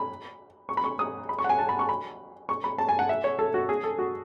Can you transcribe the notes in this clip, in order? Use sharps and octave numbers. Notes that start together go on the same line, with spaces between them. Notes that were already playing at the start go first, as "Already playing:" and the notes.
Already playing: B5
C#6
B5
C#6
D#6
B5
C#6
F#5
G#5
A5
B5
C#6
B5
C#6
B5
A5
G#5
F#5
E5
C#5
A4
F#4
G#4
A4
F#4